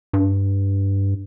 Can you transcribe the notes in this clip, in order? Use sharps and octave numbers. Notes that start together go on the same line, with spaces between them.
G2